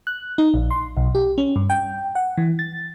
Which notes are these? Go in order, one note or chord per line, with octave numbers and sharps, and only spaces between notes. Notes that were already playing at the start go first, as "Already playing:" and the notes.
F#6
D#4
A#1
C6
B1
G4
C#4
G2
G5
F#5
E3
A6